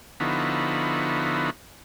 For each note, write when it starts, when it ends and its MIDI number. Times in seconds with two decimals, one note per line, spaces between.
0.20 1.50 50
0.20 1.50 53
0.20 1.50 59
0.20 1.50 63
0.20 1.50 64
0.20 1.50 66